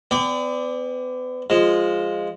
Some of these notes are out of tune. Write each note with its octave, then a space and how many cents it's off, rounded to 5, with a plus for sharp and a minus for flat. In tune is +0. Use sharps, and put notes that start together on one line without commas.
B3 +40 D5 +0 G5 +35
F3 +0 G#3 -10